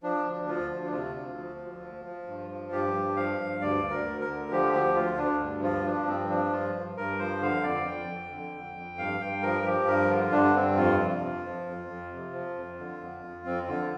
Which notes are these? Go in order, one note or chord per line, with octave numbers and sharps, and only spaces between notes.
F3 D4
D2
F3 F4
D2
D4
C3 F4
D2
F3
D2
F3
F3
G2
F3
G2 G4
G2
F3 F5
G2
D2 D5
D2
A#4
D2
A#4
D3
F3 G4
D2 G4
D2 F4
D2 D4
G2
F3 F4
F3 D4
G2 C4
F3 D4
G2 F4
G2
G2 A#4
F3 C5
D3 F5
F2 D5
F2 G5
F2
D3
F2
F2
G2 F5
G2 G5
F3 A#4
F3 G4
G2 A#4
D3 F4
G2 D4
G2 C4
F2 F4
C3
F2
F3
F2
F2
C3
F3
F2
D3
F2
F2
F2 C4
D3 F4